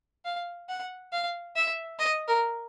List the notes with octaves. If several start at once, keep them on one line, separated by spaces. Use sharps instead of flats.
F5
F#5
F5
E5
D#5
A#4